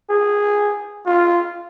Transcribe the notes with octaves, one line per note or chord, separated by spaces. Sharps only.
G#4
F4